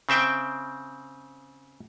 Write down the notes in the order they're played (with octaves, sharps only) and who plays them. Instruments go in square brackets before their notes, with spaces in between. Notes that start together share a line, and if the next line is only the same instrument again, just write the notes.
[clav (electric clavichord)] C#3 C4 E5 G5